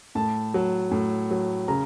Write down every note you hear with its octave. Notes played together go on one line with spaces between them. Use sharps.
A2 A5
F#3
A2
F#3
C#3 A#5